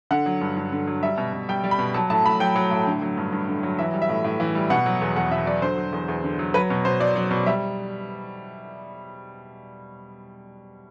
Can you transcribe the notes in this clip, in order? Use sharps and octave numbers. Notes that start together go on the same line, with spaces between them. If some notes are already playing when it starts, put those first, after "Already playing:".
D3 F#5
F#3
G2
G2
D3
F#3
G3 E5
B2
B2
G3 G5
G3
B5
B2
F#3 A5
A2 A5
A2 B5
F#3 G5
F#3
A2
D3
F#3
G2
G2
D3
F#3
E3 E5
G3
E5
A2
A2
E3
G3
B2 F#5
F#3
E2
E2 F#5
B2 E5
F#3 D5
D3 C5
F#3
E2
E2
D3
F#3
F#3 B4
B2
B2 C5
F#3 D5
F#3
B2
G3 E5